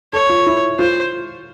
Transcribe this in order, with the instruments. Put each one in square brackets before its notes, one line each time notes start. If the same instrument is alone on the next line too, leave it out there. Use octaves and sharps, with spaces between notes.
[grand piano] A4 [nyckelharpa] C#5
[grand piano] F4
E4
[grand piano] F4 [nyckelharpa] C5